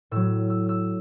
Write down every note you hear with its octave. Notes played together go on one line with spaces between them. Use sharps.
A2 F#3 E6
E6
E6